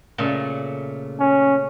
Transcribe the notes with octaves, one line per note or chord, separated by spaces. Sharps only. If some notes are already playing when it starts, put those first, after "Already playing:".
A#2 C#3 A3
C#4